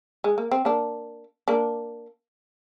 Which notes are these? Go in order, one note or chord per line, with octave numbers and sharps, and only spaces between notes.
G#3
A#3
C4
A#3 D4
A#3 D4